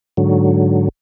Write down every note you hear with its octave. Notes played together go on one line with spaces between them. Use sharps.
G#2 D3 F#3